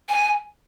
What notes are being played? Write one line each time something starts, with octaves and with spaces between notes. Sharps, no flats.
G#5